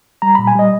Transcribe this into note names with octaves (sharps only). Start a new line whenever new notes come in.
G3 A#5
A#2 B5
G#5
G3 D#5